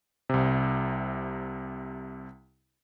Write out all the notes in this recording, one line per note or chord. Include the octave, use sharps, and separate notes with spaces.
C2 C3